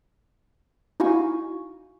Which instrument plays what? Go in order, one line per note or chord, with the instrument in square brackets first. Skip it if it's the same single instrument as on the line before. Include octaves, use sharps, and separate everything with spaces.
[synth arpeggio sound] D#4 E4 F#4 F5 G#5 C#6